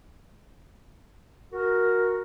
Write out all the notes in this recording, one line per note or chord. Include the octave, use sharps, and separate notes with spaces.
F#4 A#4